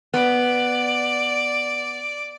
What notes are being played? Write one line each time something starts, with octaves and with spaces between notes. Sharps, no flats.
B3 D5